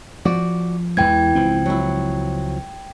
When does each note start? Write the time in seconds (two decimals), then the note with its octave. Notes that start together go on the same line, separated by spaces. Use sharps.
0.25 F3 F#4 D5
0.97 E2 E3 G#3 G5 G#6
1.35 C#2 F3 C4
1.66 F#3 E4